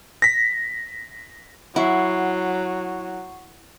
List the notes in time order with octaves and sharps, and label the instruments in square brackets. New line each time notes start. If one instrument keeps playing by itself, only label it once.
[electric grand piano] A#6 B6
[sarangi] F#3 [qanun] E4 [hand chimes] F#5 C#6 C7